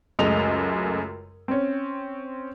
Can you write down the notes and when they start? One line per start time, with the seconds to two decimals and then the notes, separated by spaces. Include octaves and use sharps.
0.19 C#2 F#2 G#3 A3 D#5 F7
1.48 C4 C#4